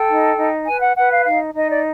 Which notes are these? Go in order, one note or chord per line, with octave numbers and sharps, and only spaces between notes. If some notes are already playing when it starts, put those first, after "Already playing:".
Already playing: A4 G5
D#4
D#4
B4 G#5
F#5
B4 F#5
F5
D#4 F5
D#4 D#5
D5